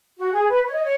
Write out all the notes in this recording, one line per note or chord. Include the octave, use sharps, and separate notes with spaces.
F#4
G#4
B4
C#5
D#5
C#5